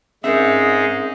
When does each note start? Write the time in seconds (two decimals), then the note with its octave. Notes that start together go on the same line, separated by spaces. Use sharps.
0.24 G#2 C4 C#4 D#4 G#4 A#4 E5